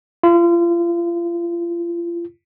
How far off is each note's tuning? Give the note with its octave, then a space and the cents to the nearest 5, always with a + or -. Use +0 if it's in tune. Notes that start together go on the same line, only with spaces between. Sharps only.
F4 -35